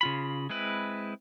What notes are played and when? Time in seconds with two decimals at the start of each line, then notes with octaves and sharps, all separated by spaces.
0.01 C#3 F4 B5
0.50 G#3 C4 E4 B4